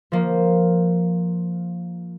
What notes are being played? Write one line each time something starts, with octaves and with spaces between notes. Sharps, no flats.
F3 A#3